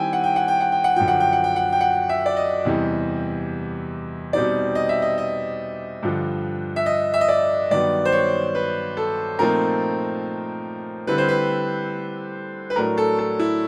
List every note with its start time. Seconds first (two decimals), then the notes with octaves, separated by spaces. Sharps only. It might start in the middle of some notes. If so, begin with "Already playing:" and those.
Already playing: D#3 G3 C4 E4 G5 G#5
0.13 F#5
0.24 G5
0.36 F#5
0.48 G5
0.60 F#5
0.72 G5
0.84 F#5
0.96 F#2 D3 F3 G5
1.08 F#5
1.20 G5
1.33 F#5
1.44 G5
1.56 F#5
1.73 G5
1.81 F#5
2.09 E5
2.26 D5
2.37 D#5
2.65 E2 C3 E3 G3
4.33 B2 G3 C4 D#4 D5
4.75 D#5
4.89 E5
5.02 D#5
5.18 D#5
6.03 G2 D3 F3
6.76 E5
6.86 D#5
7.14 E5
7.21 D#5
7.28 D5
7.71 G2 D#3 F#3 B3 D5
8.05 C5
8.12 C#5
8.55 B4
8.97 A4
9.39 A#2 F3 A3 C4 D#4 A#4
11.07 D3 G3 C4 E4 B4
11.18 C5
11.29 B4
12.70 B4
12.76 A2 F#3 A3 D4 A#4
12.98 A4
13.19 A4
13.39 E4